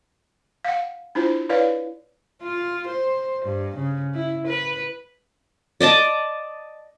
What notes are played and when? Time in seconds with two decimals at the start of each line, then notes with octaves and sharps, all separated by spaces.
0.65 F5 F#5
1.15 D4 E4 F4 C5
1.49 E4 B4 C#5 D5 F5
2.42 F4
2.86 C5
3.45 G2
3.76 C#3
4.14 E4
4.47 B4
5.80 D5 D#5 A5 D6